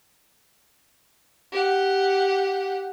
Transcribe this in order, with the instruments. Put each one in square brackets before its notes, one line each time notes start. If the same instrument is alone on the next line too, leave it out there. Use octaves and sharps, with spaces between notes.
[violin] G4 F#5